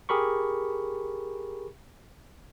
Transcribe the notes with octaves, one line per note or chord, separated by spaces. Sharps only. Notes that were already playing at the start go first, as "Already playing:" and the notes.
G4 G#4 A#4 B5 C#6